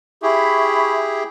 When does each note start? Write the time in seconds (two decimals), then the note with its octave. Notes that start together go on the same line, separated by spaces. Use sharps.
0.23 E4 G4 G#4 E5 B5 C#6